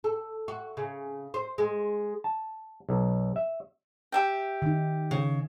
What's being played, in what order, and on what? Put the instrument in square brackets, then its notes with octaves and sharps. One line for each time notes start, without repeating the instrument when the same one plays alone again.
[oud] A4
F#4
C#3
C5
G#3
[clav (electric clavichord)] A5
B1
E5
[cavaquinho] G4 E5 G5
[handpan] D#3 D#4
[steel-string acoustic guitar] C#3